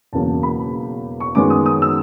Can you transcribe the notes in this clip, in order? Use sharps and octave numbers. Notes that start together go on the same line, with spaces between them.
E1 E2 C#3 F#3 A#3 A5
B5
C#6
F#2 D#3 G#3 B3 D6
D#6
D#6
E6